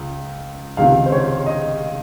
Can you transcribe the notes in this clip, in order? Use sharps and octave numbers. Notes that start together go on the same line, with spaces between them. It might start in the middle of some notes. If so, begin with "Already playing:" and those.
Already playing: C#2
C#2 C3 D#3 F5
C5
C#5
D#5